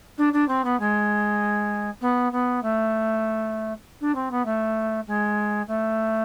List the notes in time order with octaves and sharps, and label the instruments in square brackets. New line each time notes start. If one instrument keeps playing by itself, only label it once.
[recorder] D4
D4
C4
B3
G#3
B3
B3
A3
D4
C4
B3
A3
G#3
A3